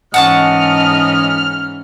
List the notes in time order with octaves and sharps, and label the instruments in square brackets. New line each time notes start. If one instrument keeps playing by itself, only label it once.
[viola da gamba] G#2 E3 C#4 [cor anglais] D#5 [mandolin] F#5 A5 C#6 [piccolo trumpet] F6